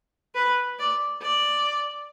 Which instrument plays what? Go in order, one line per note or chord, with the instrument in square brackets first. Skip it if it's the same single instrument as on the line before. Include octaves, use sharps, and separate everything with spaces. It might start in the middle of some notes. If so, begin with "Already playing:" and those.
[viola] B4
D5
D5